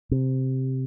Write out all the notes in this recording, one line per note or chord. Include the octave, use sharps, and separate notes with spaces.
C3